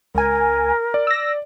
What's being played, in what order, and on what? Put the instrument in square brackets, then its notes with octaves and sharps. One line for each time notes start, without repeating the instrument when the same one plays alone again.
[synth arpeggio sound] C#2 G#5 [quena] A#4
[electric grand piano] D5
[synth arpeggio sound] E6 A#6